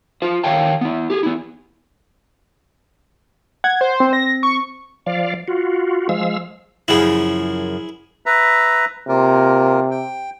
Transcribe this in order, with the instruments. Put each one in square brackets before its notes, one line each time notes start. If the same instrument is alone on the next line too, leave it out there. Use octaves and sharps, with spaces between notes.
[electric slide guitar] F4 C5
D#3 C#5 F5 G5 A5
B3 E4
G4 G#4
B3 E4
[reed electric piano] F#5 [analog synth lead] G#6
[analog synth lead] C5
[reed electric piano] C4
[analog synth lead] A#6
C#6
[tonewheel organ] F3 D5 F5
F4 F#4
F3 G#3 F5 E6
[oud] F#2 C#3 F3 [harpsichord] E4 G#4
[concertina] B4 E5 A#5
[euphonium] C3 [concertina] A#3 F4 A#4
[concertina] G5